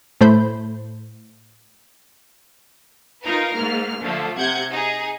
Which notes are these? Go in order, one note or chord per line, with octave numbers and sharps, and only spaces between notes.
A2 A3 C5 B5 G6
D#4 F4 A#4 B4
G#2 A#3 F6
D3 F3 A3
C3 F#5 G6 G#6
D#4 G#4